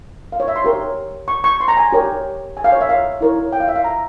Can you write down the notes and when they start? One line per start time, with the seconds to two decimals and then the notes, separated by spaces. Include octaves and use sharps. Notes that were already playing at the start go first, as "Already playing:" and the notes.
0.32 F5
0.40 C#5
0.48 E5
0.56 C6
0.64 G4 A#4 C#5
1.28 C#6
1.44 C#6
1.61 C6
1.68 A#5
1.77 G#5
1.92 G4 A#4 C#5
2.57 G#5
2.64 F5
2.72 C#5
2.81 E5
2.89 F5
3.21 E4 A#4 C#5
3.52 G5
3.60 F5
3.68 E5
3.76 F5
3.84 A#5